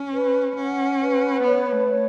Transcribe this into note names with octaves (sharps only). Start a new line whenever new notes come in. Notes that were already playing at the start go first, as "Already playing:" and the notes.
Already playing: C#4
B4
C#4 F#5
B4
B3 C#5
A3
C#5